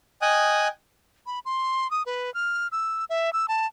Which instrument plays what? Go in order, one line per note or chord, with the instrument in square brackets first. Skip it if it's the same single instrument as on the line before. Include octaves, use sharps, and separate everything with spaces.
[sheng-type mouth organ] D#5 G5 G#5 D#6 F#6
[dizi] B5
C6
D#6
B4
F6
E6
E5
E6
A5